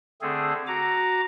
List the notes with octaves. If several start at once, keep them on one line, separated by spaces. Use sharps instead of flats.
D3 A3 C4 G#4 A4
F#4 A#5 D6